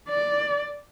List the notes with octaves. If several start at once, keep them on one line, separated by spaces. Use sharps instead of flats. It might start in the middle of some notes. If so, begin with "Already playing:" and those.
D5